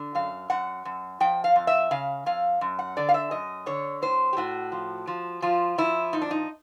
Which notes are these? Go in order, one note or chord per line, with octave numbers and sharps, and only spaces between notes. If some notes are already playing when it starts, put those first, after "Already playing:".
Already playing: D3
F#2 F5
F#2 F#5
F#2
F3 G5
F5
F2
E5
C#3 F5
F2 F5
F#2
F#5
D3 D5
F5
E5
F#2 D#5
D3 C#5
A2 C5
G4
A2 F#4
F3
F3
F3 F4
F3 E4
A#2 D#4
D4
D#4